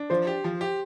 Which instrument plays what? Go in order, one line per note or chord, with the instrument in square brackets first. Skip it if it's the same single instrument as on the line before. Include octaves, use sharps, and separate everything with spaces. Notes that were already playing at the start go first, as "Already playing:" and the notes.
Already playing: [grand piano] D4
[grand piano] F3 [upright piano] C5
[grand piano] G4
F3
G4